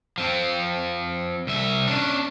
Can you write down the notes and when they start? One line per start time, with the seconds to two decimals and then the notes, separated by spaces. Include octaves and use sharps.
0.18 F3 C4
1.47 C2 E5
1.87 C#4 D4